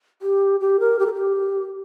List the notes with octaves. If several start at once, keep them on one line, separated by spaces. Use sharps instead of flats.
G4
G4
A#4
G4
A4
G4